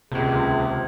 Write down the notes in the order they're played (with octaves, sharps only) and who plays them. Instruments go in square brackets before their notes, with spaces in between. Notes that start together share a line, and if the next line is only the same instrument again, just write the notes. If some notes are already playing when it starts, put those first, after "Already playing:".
[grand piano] D#1 C#2 [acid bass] C3 [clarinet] G#4